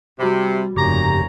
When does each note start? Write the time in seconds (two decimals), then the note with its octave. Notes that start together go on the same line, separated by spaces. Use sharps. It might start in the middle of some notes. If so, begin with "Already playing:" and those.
0.20 C3 G3 F#4 B5
0.76 F1 G2 A#2 C#3 G4 C#5 A#5